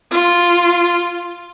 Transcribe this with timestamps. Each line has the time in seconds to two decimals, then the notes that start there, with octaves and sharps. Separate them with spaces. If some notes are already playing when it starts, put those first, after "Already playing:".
0.11 F4